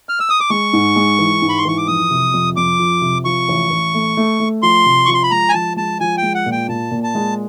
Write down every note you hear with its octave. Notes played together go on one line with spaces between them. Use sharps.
F6
E6
D#6
D6
G#3 C#6
G#2
G#3
E3
G#2
B5
C6
E3 C#6
D6
F2 D#6
C3
F2
F2 D6
F3
C3
F3 C#6
A1
A1
A3
A3
A3
F3 C6
C3
F3 C#6
C6
B5
G#3 A#5
G#5
F3 A5
G#3 A5
F3 G#5
G5
G#3
F#5
A#2
G5
A#2 A5
A#2
A5
G#3